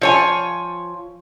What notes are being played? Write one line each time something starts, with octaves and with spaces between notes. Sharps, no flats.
F3 C#5 G#5